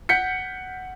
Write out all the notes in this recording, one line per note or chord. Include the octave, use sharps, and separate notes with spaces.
F#5 G6 B6 C#7